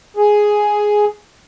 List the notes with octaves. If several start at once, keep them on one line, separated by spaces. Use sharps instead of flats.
G#4